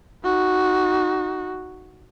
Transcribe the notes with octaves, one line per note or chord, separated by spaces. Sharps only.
D#4 F#4